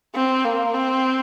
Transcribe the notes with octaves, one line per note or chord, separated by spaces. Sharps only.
C4
A#3
C4